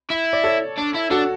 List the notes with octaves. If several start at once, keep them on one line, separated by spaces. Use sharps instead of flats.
E4
D5
A4 C#5
D4
E4
D4 F#4 A4